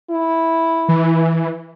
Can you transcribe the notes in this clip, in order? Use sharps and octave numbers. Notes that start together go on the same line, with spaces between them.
E4
E3